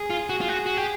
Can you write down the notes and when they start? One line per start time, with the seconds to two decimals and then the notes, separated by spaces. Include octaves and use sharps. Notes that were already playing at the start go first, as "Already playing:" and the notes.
Already playing: G#4
0.10 F4
0.29 F#4
0.41 F4
0.49 F#4
0.66 F#4
0.77 G4